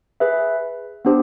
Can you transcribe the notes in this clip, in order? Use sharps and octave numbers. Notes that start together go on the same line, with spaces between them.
G#4 B4 E5
B3 D4 G4 C5